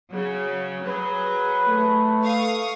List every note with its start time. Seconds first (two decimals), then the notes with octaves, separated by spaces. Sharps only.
0.11 C#3 F#3
0.87 F#3 G#4 B4
1.67 A3
2.24 F5 C#6 D#6